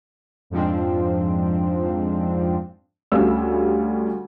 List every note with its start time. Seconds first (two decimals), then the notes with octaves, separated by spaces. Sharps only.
0.50 F2 G#2 F3 C4 D4
3.12 D2 G3 C#4 F5 E6